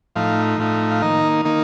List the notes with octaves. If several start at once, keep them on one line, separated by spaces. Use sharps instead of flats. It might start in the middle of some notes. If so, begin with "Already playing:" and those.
A2 F3 A3 D#4 F5
A2 F3 A3 D#4
F5
D#3 A#3 D#4 D#5
D#3 A#3 D#4